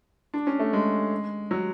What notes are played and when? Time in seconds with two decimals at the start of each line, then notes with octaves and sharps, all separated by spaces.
0.34 D4
0.47 C#4
0.59 A3
0.73 G#3
1.51 F#3